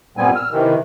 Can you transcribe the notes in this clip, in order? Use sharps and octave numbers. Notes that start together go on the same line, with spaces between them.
G2 A#2 G3 B3 C4 G#5
E6 F6
C3 D#3 E3